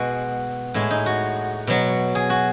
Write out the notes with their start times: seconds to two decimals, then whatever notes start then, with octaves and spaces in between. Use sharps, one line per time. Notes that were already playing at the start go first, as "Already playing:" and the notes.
Already playing: B2 G#3 F#4
0.74 A2 G#3 E4
0.90 D#4
1.06 F#4
1.67 B2 F#3
2.15 G#4
2.30 F#4